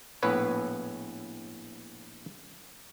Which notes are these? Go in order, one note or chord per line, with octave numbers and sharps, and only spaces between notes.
A#1 A2 B3 B4 C#5